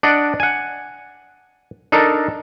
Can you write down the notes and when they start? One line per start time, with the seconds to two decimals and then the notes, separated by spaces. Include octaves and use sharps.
0.03 D4 D5 D#5 F#5
0.40 F#5 G#5
1.92 D4 D#4 A4 A#4